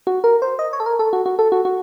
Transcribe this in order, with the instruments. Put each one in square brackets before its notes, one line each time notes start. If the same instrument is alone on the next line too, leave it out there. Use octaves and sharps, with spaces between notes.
[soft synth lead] F#4
A#4
C5
D#5
C#5
A4
A#4
A4
F#4
F#4
A4
F#4
F#4